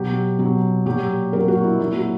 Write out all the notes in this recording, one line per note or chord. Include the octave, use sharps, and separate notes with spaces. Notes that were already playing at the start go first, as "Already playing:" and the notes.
Already playing: B2 F#3 G4
B2 F#3
A#2 F#3 G4
A#2 F#3 A#4
F#4
E4
A#2 F#3 E4
F#4